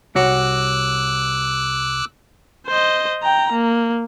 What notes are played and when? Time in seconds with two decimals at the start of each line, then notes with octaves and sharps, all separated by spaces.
0.16 C2 F#4 C#5 D6 E6 F#6
2.67 C5 D#5
3.23 G5 A#5
3.52 A#3